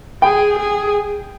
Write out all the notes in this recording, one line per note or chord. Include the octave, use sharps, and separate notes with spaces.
G#4 G5
G#4